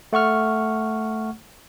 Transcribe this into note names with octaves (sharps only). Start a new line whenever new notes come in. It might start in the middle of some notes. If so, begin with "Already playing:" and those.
A3 F#5 C#6 F6